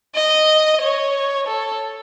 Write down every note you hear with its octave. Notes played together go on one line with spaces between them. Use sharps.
D#5
C#5
A4